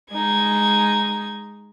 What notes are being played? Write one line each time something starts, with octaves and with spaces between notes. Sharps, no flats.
G#3 D#4 G#6